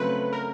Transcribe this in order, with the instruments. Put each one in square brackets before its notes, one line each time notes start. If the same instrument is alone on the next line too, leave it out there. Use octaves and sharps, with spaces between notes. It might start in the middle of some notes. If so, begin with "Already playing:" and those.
Already playing: [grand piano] C#3 F#3 A3 C4 [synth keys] B4
[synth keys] A#4